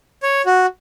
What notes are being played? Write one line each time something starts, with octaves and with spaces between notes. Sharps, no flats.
C#5
F#4